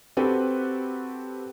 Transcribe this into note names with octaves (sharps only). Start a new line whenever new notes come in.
C4 F#4 G4 A4 B4